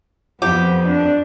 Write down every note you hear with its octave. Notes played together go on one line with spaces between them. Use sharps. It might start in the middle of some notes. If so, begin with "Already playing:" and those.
F2 B3 G4
D4